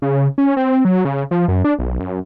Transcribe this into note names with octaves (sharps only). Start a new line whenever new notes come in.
C#3
C#4
C4
F#3
C#3
F3
F#2
D4
B1
F#2